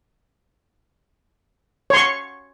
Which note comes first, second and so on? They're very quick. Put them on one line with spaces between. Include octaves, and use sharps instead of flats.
C#5 C6 C#6